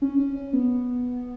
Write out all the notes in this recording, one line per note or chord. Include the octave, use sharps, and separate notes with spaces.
C#4
C#4
C#4
B3